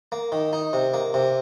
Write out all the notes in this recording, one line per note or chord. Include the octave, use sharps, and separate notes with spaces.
A#3
D#3
D#4
C3
A#3
C3